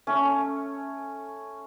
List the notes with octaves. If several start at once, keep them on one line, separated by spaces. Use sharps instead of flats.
A3 C#4